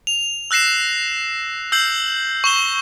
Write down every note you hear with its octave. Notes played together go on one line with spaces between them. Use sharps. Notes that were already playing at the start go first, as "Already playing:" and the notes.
F7
E6 F#6 A#6 C7 E7
E6 G6 C7 F#7
C#6 E7 G7